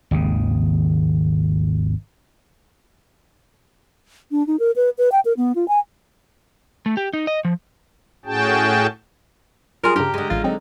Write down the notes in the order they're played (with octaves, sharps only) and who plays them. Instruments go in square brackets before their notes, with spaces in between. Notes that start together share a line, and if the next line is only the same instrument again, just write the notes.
[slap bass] G#1 D#2 C#3
[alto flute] D4
D#4
A#4
B4
B4
G5
A#4
B3
F4
G#5
[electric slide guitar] A3
G4
D#4
D#5
F3
[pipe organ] A2 C#4 F#4 G#4 G5 A5
[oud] G3 G#4 [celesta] F4 C6 F6 [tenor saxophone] A#4
[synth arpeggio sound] G2 C#3 [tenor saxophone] G4 [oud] A#4 [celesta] A#5 F6
[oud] D3 G#3
[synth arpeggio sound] A1 A6 [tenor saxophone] F4
[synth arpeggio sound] F#3 C4 [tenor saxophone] D#4